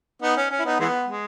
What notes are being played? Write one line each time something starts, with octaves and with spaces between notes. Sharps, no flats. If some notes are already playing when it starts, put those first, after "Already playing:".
B3 D#4
C#4
C#4
E4
B3 D#4
E3 G#3 B3
G#3